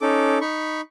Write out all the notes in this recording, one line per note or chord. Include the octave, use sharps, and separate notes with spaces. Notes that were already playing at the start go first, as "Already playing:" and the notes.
C#4 D#4 A4 D6
D#4 B5 C#6